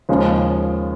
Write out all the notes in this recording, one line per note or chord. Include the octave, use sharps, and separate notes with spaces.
D#2 C#3 F3 G#3